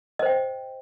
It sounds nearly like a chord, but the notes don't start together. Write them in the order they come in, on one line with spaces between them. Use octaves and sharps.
D#5 C5 G5